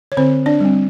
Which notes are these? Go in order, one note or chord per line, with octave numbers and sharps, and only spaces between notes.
C#5
D3 C4 C5
D4 D5
G3 C4